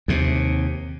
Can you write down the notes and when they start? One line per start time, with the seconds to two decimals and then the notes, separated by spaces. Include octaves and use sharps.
0.08 D#2 C3